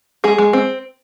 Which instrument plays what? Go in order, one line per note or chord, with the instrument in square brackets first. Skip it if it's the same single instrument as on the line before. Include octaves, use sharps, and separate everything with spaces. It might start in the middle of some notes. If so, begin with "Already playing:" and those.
[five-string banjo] G#3 G#4
G#3
C4